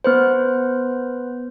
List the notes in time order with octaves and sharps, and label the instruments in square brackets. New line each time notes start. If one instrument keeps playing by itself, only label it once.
[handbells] B3 B4 C5